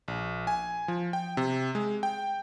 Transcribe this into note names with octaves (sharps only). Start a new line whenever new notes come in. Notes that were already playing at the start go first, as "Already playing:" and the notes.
A#1
G#5
F3
G5
C3
G#3
G5